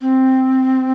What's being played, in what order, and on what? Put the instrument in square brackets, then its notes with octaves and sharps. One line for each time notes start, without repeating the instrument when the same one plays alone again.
[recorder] C4